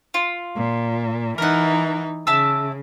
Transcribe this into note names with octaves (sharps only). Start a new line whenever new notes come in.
F4
A#2
E3 D#4 A#4 F#5
C#3 E5 A5 E6